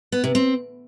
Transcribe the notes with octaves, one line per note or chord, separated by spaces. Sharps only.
B3
C3
C4